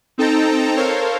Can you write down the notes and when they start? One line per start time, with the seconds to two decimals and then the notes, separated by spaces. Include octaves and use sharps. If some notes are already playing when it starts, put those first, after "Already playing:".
0.18 C4 D#4 A4 G5 A5 A#5
0.76 A4 A#4 C5 C#5 F5